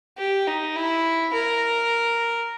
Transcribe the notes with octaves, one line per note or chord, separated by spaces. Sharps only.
G4
D#4
E4
A#4